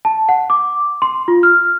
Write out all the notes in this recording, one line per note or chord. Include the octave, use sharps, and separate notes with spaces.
A5
F#5
D6
C6
F4
F6